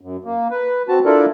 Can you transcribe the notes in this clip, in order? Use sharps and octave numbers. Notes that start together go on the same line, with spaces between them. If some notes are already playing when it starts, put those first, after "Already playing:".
F#2
A#3
B4
C4 F#4 A5
D4 E4 F4 A4 A#4 D5